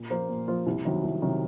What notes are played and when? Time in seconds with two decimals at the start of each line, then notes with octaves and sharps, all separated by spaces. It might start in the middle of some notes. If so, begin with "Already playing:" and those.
Already playing: A#2
0.10 F3 A#3 F4 C5
0.29 A#2
0.48 F3 A#3 F4 C5
0.66 C2
0.85 C3 D#3 F#3
1.04 C2
1.22 C3 D#3 F#3